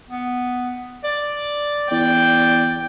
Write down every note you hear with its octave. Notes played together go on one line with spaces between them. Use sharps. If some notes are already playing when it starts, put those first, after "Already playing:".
B3
D5
E2 D5 G5